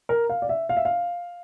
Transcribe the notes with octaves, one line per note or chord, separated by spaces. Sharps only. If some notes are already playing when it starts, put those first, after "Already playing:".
A#4
F5
D5
E5
F5
E5
F5